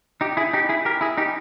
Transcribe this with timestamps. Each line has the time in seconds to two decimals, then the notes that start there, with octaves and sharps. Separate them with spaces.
0.21 D#4 G4
0.37 E4 G#4
0.53 D#4 G4
0.69 E4 G#4
0.85 G4 A#4
1.01 E4 G#4
1.18 D#4 G4